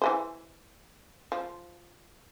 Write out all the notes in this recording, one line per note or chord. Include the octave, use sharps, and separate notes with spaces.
E3 G#3 C5
F3